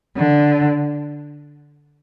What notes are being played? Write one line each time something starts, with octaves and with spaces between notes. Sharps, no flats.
D3